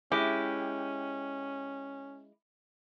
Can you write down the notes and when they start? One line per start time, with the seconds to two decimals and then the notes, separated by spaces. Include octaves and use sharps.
0.12 G#3 C#4 E4 G4